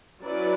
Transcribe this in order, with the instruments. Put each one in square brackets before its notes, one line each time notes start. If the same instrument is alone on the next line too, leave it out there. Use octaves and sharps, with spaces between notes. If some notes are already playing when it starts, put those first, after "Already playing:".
[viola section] F#3 C#4 E4 B4 D5